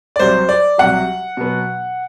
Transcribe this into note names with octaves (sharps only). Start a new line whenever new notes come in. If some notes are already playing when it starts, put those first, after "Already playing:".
D5
C2 C3 F#3 C5
D5
C2 C3 F#3 F#5
B2 F#3 B3